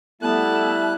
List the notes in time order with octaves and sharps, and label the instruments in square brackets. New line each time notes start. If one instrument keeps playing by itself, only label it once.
[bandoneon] G3 F#6 [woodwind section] A3 B3 [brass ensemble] E4 [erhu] A5